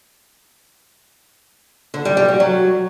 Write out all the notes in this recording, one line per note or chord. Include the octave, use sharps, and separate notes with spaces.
D3
G3
G3
F#4
F#3